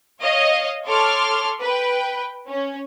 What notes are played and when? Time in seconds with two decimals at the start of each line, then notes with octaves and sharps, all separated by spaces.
0.21 C#5 D#5 F5
0.86 A4 C#5 C6 D6 F6
1.62 B4 G5
2.47 C#4